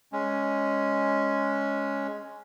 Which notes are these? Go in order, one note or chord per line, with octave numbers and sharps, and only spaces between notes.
G#3 C#4